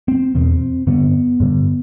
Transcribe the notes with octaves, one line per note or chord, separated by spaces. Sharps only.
C4
E2 B2 C4
G2 D3 B3
G2 D3